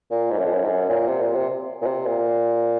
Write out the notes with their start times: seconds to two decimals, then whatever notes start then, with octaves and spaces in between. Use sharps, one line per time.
0.11 A#2
0.31 G#2
0.38 F#2
0.45 F2
0.53 F#2
0.65 G#2
0.69 F#2
0.89 A#2
1.08 C3
1.21 A#2
1.35 C3
1.82 A#2
1.86 C3
2.06 A#2